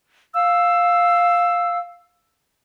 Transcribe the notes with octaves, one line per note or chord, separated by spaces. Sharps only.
F5 E6